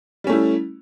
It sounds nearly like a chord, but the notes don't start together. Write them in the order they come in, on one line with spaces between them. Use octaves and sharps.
G3 C#4 A3 E4